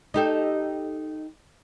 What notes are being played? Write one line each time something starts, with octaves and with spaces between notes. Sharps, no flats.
D#4 G4 A4